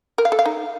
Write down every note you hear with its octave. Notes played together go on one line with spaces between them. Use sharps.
A#4
F5
A4
F5
D#4